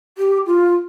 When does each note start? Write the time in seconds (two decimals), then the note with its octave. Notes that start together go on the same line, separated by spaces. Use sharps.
0.18 G4
0.47 F4